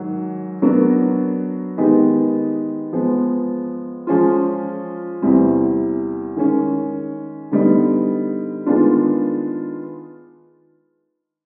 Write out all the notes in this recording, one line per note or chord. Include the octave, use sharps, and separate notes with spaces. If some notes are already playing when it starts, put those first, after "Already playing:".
Already playing: G#2 D#3 F#3
F#3 B3 D4 F#4 A#4
D#3 G#3 B3 D#4 G4
F3 G#3 B3
F3 G#3 C#4 F4
E2 C3 E3 G3 C4
D#3 G#3 C#4
D3 G3 B3 D#4
D#3 G#3 B3 D4 F4